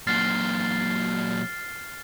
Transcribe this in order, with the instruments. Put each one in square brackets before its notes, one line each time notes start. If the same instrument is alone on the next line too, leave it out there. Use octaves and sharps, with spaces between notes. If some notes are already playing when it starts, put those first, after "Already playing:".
[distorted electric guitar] A#2 F#3 [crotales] F6 A6 C7